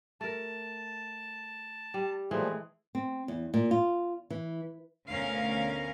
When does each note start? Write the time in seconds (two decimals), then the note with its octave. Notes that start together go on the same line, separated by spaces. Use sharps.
0.21 A3 A#4 A5
1.94 G3
2.31 A#2 E3 F3 G#3 A3
2.95 C4
3.28 E2
3.54 A#2
3.71 F4
4.30 E3
5.10 D2 B2 C#4 A#4 F5